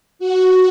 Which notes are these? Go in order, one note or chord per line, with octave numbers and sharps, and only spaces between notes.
F#4